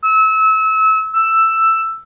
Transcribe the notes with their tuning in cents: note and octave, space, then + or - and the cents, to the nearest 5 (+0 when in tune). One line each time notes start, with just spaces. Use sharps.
E6 -30
E6 +5